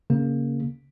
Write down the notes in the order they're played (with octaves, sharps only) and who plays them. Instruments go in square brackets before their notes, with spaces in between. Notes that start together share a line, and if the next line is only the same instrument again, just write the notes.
[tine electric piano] C#3 A#3